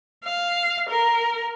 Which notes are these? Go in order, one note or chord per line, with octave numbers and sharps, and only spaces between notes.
F5
A#4